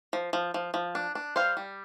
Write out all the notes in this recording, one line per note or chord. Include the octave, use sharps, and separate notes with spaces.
F3
F3
F3
F3
D4
D4
G3 C5 F5
G3